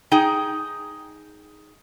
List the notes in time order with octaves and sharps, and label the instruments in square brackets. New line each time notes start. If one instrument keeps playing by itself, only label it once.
[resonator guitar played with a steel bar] D#4 G#4 G5